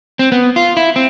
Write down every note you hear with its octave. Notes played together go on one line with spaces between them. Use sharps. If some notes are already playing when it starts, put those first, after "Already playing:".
C4
B3
F4
E4
C4